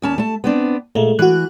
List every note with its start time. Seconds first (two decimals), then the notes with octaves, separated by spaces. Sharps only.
0.02 D#2 C#4 A5
0.18 A3 A5
0.44 B3 C4 D4
0.95 A#2 G#3 A3
1.19 E3 F#4 F#6